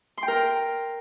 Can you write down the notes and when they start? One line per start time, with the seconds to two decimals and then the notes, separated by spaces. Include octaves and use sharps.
0.17 C6
0.23 G5
0.28 A#4